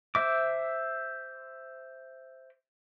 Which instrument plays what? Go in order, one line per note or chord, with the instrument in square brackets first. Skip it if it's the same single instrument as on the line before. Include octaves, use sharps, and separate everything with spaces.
[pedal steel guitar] C5 E5 D6